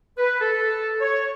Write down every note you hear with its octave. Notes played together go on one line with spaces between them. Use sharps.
B4
A4
C#5